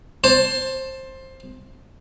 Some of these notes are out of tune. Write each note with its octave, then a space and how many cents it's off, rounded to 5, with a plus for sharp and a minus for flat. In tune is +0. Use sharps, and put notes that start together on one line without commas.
C5 +15 A5 +10